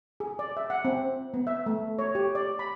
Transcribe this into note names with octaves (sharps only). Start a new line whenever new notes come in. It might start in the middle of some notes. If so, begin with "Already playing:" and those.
G#4
D5
E5
F#5
C4
B3
E5
A3
C#5
G4
D5
B5